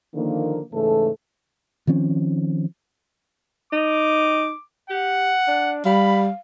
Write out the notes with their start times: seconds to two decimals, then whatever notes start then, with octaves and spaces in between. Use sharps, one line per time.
0.15 D3 D#3 F3 A#3
0.72 G#2 C#3 E3 A3 A4
1.87 D#3 F3 C4 C#4
3.73 D#4 D6
4.90 G4 F#5
5.48 D4
5.86 G3 F5 B5